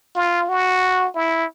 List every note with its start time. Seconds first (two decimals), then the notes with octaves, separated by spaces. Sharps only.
0.16 F4
0.49 F#4
1.15 E4